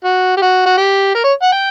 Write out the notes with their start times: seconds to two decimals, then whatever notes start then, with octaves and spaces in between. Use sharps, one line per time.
0.04 F#4
0.37 G4
0.42 F#4
0.66 F#4
0.78 G4
1.15 A#4
1.24 C#5
1.42 F#5
1.52 G5